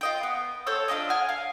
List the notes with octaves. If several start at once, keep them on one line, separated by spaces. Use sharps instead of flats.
F4 D#5 G5
B3
A4 C5 C#5 E6
D4 F4 G4 D#5
F#5 G#5 F6
F5